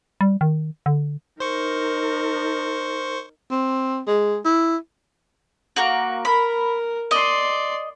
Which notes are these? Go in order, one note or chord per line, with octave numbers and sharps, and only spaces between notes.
G3
D#3
D3
D#4 A#4 C5 C#6
C4
G#3
E4
A#3 F#4
A#4 B5
D5 D#5 C6